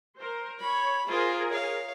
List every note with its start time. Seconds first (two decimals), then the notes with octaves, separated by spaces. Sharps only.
0.18 A#4 C5
0.61 C#5 B5
1.09 F4 G#4 A#4 C5
1.50 C#5 F5